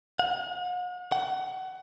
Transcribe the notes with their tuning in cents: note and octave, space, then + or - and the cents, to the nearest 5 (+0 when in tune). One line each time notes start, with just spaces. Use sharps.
F#5 -45
F#5 +25